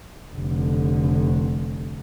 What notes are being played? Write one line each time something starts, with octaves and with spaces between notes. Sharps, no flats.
F1 D3